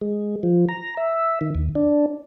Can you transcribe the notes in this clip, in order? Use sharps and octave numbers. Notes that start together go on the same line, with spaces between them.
G#3
F3
A#5
E5
D#3
D#2
D4